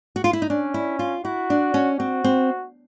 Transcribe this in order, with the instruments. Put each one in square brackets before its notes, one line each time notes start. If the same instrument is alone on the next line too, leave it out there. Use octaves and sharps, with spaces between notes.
[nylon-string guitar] F#4
F4
E4
D#4
[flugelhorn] C#4 [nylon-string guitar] D4
[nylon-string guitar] E4
F4
[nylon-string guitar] E4 [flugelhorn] F#4
[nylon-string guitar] D4
C#4
[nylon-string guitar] C4 [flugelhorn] F#4
[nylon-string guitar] C4